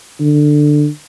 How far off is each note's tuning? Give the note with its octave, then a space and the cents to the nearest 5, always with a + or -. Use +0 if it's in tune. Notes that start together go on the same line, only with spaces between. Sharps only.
D3 +15